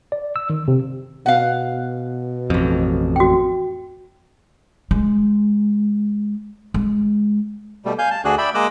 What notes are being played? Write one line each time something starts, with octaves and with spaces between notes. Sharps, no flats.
D5
E6
D#3
C3
B2 F5 F#5
A1 F2
F#4 G5
G#3
G#3
B2 G3 A3
F5 G#5 G6
A5
D2 D4 F#4 G#4 F#6
D5 E5 G5 B5
G#3 A#3 D#5 D6 E6 F#6